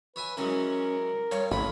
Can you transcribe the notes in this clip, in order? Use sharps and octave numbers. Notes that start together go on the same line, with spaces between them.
B4 C#5 E5 G#5
E3 F#3 G#3 C#4 A#4
G2 C#5
A1 F2 D3 C#5 B5